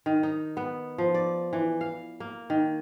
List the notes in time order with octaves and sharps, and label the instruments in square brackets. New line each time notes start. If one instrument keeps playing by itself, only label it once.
[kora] D#3
D#4
B3
F3
D5
E3
F5
A#3
D#3